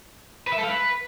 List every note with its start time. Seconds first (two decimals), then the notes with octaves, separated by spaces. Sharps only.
0.47 B4
0.52 E5
0.58 A4
0.63 F5
0.69 B4